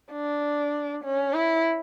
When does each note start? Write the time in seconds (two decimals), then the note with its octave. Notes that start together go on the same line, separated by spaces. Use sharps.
0.12 D4
1.04 C#4
1.34 E4